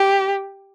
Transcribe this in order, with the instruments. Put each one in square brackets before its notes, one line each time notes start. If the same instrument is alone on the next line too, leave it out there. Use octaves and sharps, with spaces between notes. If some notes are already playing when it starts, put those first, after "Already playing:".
Already playing: [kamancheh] G4